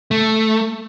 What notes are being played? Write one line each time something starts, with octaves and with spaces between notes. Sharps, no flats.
A3